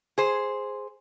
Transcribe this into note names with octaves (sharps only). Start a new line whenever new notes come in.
G#4 C5